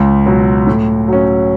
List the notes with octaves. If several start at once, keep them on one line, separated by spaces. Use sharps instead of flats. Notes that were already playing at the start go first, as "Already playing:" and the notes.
Already playing: C#2
B2 F#3
A2
F#3 C#4